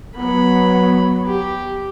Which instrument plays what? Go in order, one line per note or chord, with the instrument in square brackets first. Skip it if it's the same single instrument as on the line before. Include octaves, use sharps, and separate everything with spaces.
[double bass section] F#3 B3 [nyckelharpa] B5
[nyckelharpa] G4